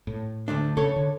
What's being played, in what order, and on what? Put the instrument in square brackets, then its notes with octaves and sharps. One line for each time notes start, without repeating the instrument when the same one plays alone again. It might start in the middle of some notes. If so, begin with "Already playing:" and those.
[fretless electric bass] A2
[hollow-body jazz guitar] D2 A3 D4
[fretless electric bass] C#3 [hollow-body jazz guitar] A4 C#5
[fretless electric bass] D3